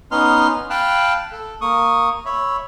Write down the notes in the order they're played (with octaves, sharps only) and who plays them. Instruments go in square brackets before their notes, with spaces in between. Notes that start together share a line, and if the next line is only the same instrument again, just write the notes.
[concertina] B3 C#4 D#4 C6 F6
F5 G5 A5 B5 F#6
A4
A#3 C#6 D#6
C#5 E5 B5